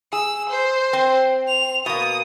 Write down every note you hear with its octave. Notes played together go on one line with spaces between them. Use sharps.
G#4 E6
C5
C4
F7
B2 A#3 D#6